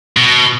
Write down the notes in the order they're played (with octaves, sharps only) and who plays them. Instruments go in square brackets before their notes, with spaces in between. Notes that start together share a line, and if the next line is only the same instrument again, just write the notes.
[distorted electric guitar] B2